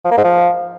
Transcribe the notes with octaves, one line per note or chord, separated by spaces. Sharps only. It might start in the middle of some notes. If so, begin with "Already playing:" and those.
F3
A#3
G#2
F3